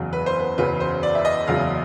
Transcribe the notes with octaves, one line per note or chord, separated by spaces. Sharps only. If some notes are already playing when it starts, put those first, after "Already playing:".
Already playing: F#1 E2 C#3 F#3
B4
C5
B4
F#1 E2 C#3 F#3 B4
C5
D5
E5
D#5
F#1 E2 C#3 F#3 F5